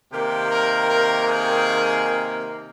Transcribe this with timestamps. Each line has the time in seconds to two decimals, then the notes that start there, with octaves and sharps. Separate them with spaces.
0.12 C3 D#3 A#3 G4
0.51 A#4
0.89 A#4
1.28 G#4